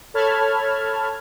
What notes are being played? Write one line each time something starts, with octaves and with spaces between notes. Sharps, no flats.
A4 C#5 A5 B5 F6 G#6